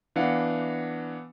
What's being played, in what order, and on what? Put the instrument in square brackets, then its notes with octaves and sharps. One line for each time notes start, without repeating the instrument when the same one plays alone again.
[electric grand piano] E3 B3 D4 F5 F#5 C#7